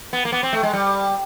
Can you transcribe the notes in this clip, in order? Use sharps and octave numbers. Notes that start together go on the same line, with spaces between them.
B3
A#3
B3
C4
A3
G#3
G3